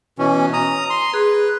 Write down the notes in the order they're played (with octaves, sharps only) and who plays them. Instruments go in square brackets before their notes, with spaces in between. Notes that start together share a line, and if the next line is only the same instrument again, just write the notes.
[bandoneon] B2 E3 C#4
A#5 D#6
C6
[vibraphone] G#4 [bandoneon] B4